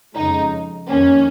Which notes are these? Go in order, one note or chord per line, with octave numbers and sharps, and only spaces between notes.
F2 C#3 G#3 D#4
F2 D#3 A#3 C#4